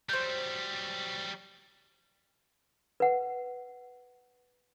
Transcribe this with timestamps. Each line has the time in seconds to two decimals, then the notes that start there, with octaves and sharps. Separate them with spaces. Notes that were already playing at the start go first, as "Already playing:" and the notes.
0.09 F#3 G3 C5 G6
3.00 B4 F#5